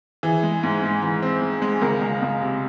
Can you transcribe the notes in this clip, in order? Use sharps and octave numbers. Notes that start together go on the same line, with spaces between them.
E3 G#4
G#3
G#2
G#3
E3
C4
G#3
G#3
C#2 A#4
C#2
C#2
C3